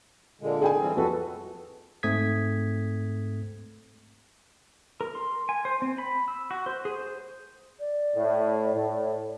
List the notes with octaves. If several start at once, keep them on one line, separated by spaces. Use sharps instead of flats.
A#2 D3 G#3
G#4 G5 G#5
E3 G3 C4
F2 F#4 A4 B4
G#2 A3 C4 D#6 G#6 B6
A#4
C6
G#5
C5
C4
B5
E6
F#4
C5
G#4
C5
D5
A2
A2